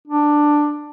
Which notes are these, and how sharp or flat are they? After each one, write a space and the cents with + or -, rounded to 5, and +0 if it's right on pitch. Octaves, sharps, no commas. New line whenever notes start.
D4 +10